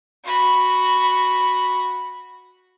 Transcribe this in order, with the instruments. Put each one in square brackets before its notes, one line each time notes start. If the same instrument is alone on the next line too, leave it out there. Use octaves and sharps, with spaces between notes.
[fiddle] F#4 B5